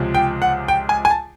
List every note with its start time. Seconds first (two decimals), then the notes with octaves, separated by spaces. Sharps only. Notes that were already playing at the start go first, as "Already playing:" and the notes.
Already playing: C#2 C3 F3 G#3
0.14 G5
0.42 F#5
0.68 G5
0.89 G#5
1.05 G#5
1.10 A5